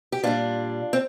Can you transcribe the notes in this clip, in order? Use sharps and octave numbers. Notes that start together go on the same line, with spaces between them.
G4
A#2 G3 D4 F4
C4